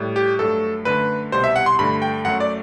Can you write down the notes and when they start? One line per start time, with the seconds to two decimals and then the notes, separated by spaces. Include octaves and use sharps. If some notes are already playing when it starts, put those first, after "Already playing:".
Already playing: A2 G3
0.16 G4
0.39 G2 F#3 A3 A4
0.85 F#2 D3 A3 B4
1.32 C2 B2 G3 C5
1.44 E5
1.56 F#5
1.66 C6
1.79 G2 D3 A3 B5
2.02 G5
2.25 F#2 F#3 A3 F#5
2.40 D5